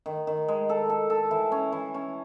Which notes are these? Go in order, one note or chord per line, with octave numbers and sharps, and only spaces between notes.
D#3
D#3
G#3
A4
A4
A4
E3
C#4
E3
C#4